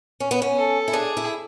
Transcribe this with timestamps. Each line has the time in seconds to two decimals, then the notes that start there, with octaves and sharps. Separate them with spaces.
0.20 C#4
0.31 B3
0.42 C#4
0.57 A4
0.88 E4
0.93 D4 G#4
1.17 E4